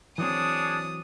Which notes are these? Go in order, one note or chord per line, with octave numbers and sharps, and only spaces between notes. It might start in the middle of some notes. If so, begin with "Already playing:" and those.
E3 F#3 C4 D4 G#4 C#5 D#6